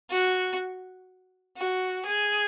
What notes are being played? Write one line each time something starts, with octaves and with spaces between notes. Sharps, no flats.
F#4
F#4
G#4